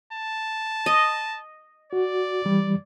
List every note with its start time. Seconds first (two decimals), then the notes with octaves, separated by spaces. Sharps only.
0.13 A5
0.86 D#5
1.93 F#4 D5
2.45 E3 G3